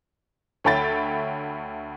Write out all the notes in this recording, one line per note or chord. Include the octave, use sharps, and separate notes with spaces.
D2 C#5 E5 G5 B5 A6